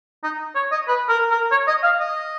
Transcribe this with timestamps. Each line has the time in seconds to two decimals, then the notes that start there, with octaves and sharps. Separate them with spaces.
0.23 D#4
0.55 C#5
0.72 D#5
0.88 B4
1.09 A#4
1.30 A#4
1.51 C#5
1.67 D#5
1.83 F5
1.99 D#5